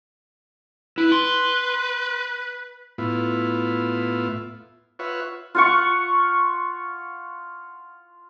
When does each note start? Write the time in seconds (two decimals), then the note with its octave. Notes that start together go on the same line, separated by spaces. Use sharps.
0.98 E4 B4
1.12 C6
2.98 A2 B3 E4 F4
4.99 F4 B4 C#5 E5 F#5
5.55 F4 F#5 C#6